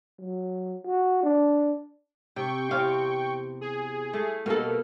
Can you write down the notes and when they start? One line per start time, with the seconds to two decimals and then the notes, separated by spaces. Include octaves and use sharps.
0.20 F#3
0.86 F#4
1.23 D4
2.36 C3 G5 C#6
2.71 E2 C3 F5
3.61 G#4
4.13 A3
4.46 B2 A#3 A4